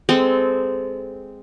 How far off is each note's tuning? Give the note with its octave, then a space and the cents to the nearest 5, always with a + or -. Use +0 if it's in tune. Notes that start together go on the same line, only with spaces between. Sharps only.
G#3 -15 C4 -15 A4 -20